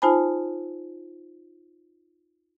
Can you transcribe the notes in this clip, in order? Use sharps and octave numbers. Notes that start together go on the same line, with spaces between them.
D#4 F4 C5 G#5 A5 B5